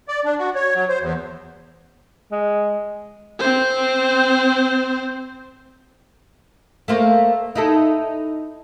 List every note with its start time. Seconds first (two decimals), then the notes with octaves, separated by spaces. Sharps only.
0.08 D5
0.25 D4
0.39 F#4
0.55 C#5
0.74 F#3
0.89 C5
1.01 E2
2.32 G#3
3.39 C4 C5
6.88 A3 A#3 C5
7.55 D#4 E4 A4